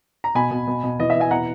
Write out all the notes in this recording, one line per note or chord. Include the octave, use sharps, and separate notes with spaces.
A#5
B2 G#5 B5
B2
B2
B2
E3 D#5
E5
E3
E5 G#5
B2 F#5 A#5